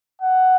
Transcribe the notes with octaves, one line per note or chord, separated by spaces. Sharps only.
F#5